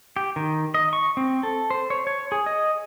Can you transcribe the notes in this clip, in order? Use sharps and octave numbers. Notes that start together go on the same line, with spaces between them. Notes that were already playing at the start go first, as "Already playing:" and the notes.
G4
D#3
D#5
C#6
C4
A4
C5
C#5
C#5
G#4
D#5